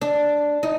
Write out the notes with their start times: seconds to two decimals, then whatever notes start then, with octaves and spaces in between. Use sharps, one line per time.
0.01 D4
0.63 D#4